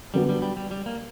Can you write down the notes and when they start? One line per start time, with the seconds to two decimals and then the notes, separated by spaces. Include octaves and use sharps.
0.14 D3 F#3 G3 B3 F#4
0.29 G3
0.42 G3
0.57 G3
0.71 G3
0.86 A#3